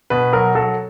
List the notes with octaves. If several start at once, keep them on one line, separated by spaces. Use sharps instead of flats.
B2 B4
F#3 A#4
F#3 A4